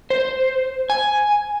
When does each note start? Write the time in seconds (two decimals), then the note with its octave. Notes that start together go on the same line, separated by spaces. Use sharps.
0.10 C5
0.90 G#5